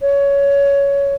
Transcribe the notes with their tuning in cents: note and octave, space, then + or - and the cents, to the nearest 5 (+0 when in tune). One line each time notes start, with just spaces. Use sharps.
C#5 +15